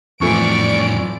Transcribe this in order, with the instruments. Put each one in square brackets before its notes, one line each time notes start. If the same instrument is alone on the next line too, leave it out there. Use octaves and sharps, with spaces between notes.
[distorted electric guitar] F2 A2 [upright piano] E3 F3 A3 [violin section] D5 D7 [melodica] C#6